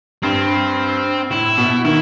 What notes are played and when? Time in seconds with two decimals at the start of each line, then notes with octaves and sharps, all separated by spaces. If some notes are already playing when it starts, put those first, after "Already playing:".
0.23 G2 C4
1.30 A2 E4
1.58 B2
1.85 D#3 E4